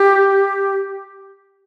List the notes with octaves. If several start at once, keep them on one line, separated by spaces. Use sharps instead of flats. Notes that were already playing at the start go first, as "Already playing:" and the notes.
Already playing: G4